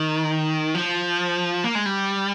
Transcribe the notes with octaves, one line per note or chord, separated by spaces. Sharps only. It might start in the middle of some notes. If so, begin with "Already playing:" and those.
Already playing: D#3
F3
A#3
G#3
G3